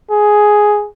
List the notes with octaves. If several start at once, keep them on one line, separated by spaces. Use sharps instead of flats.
G#4